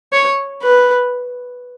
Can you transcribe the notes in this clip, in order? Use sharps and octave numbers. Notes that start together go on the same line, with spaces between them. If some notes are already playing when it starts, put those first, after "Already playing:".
C#5
B4